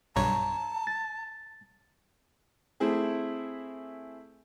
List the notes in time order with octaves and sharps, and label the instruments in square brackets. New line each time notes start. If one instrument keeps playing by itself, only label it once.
[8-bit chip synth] B1 G2 C#5 [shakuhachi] A5 [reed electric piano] A#5
[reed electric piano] A6
[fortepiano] A3 C4 E4 G#4